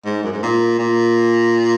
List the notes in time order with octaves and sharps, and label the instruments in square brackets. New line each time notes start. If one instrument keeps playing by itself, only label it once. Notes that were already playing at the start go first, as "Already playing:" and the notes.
[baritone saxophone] G#2
F#2
G#2
A#2
A#2